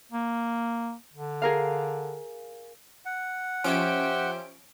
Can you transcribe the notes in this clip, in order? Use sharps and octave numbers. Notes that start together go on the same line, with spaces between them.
A#3
D3
G#4 A#4 F5
F#5
F3 C#4 G4 C5 E5 D7